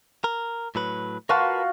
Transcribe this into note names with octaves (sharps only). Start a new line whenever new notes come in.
A#4
A2 F#3 B4
F4 F#4 A#4 B4 A5